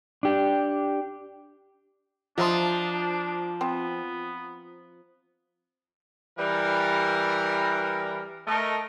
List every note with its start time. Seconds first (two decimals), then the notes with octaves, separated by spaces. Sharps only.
0.23 D4 G4
2.38 F3 D4 F4 D#5 E5 A#5 C6 D#6
3.61 B3 C4
6.38 E3 G3 A#4
8.47 A3 A#4 D#5